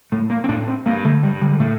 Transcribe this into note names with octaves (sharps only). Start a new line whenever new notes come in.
A2 A3
A#3
C4
A2 D4
C4
G2 A#3
D3 A3
G2 G3
D3 G3
G3
A2 A3